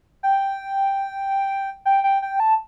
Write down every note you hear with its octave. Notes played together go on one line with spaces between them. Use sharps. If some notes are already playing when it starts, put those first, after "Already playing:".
G5
G5
G5
G5
A5